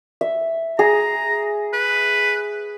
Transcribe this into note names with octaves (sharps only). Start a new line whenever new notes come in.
E5
G#4 A#5
B4